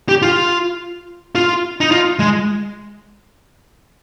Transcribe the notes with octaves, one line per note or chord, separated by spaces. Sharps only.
G4
F4
F4
D#4
F4
G#3